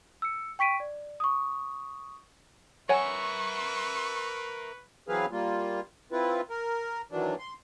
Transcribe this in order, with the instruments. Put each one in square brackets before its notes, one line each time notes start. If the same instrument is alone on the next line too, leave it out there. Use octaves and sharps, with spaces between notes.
[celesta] E6 C#7
G5 C#6 B6 D7 D#7
D5
C#6 D#6
[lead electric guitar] A#4 E5 [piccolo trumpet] B4 [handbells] C#5 F#5 G#5 [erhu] C#6
[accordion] E3 F#3 C4 G#4 B4 F5
G3 A#3 F4
C4 E4 F4 B4
A#4
D#3 E3 F#3 D4
C6